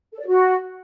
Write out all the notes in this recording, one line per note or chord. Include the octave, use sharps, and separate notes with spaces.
A4
D5
F#4